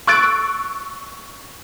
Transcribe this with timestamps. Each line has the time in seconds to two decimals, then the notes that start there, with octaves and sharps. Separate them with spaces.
0.07 C#6 E6 F#6 A6 D7